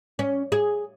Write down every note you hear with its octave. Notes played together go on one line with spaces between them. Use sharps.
C#4
G#4